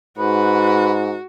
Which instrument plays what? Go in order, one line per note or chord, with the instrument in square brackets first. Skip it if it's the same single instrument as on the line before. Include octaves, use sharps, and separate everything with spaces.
[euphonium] G#2 [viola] F#4 [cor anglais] B4